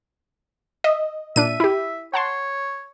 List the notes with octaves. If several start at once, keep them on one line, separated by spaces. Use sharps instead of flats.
D#5 E5
A#2 D4 E5 D#7
E4 G4
C#5 F#5 A5 C6